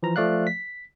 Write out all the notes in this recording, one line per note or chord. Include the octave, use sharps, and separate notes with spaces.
E3 F3 A#5
F3 A3 D5 F5 F#6
B6